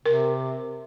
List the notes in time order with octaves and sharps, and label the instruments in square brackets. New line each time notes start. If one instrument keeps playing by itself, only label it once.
[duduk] C3 [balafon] A#4